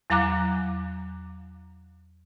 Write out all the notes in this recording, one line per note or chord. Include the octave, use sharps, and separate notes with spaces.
E2 F#3 F5 A#5 D6 F#6